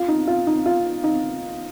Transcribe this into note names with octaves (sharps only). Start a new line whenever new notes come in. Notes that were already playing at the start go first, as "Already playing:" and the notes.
Already playing: F4
D#4
F4
D#4
F4
D#4